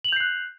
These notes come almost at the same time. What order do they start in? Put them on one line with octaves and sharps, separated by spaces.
F#7 F7 G6 C7 F#6